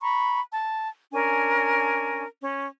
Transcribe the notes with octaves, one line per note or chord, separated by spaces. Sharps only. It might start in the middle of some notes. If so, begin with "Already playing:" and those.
A#5 B5 C#6
A5
C#4 D4 A#4 G#5
C#4